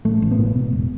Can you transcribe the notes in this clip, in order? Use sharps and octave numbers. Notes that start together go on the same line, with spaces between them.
A1 A3
A1
B3
A2
B2
E1